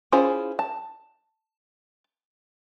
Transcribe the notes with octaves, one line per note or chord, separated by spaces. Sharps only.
C#4 E4 F4 G#4 C5
A5